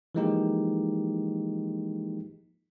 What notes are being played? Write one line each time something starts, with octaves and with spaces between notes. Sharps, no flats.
E3 F3 G#3 A#3 D#4 G4